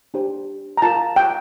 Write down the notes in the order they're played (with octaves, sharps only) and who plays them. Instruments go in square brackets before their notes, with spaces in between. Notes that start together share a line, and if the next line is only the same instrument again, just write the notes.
[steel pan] D4 G4 C5
A#5
F4 A#4 A5
G5